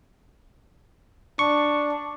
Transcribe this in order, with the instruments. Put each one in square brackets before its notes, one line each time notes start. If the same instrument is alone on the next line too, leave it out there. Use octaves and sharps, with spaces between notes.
[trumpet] D4 [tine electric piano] C#6